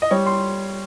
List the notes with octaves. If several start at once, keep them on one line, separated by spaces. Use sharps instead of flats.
D#5
G3 C#5
C6